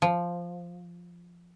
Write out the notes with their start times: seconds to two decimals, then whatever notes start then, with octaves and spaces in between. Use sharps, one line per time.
0.02 F3